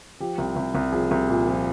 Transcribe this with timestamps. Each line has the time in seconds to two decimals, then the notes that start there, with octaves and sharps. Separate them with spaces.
0.20 F3 G4
0.38 C2
0.56 C2
0.75 C2
0.92 F3 G#4
1.11 C2
1.29 A#2
1.47 F3